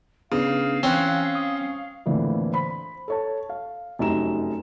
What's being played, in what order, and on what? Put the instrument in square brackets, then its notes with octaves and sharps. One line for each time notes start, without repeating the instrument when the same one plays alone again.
[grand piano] C#3 [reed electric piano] B3 D4 [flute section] F5
[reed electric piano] E3 G#5 F#6 [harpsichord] C4 [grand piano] C#4
[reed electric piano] D#6
[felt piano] F2 A2 D3 E3 A#3
C5 B5
A4 C#5 A5
F5
F1 F#2 D#4 G4 A#5 E7